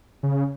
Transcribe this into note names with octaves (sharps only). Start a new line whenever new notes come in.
C#3